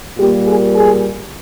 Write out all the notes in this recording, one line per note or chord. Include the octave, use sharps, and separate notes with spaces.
A#2 G3 A#3 G4
G#4
G#4